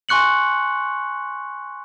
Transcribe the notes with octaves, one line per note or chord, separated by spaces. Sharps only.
G#5 C6 C#6 F#6 C#7 F#7